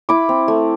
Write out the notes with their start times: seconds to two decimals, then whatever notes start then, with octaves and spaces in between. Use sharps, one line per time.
0.09 E4 B5 D6
0.29 C4
0.48 A3